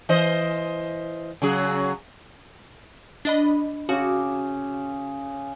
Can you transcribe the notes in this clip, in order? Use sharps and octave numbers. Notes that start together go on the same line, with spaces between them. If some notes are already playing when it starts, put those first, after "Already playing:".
E3 C5 D#5
C#3 F#3 G#4
D4 D#5 B5
C#3 F#4 D6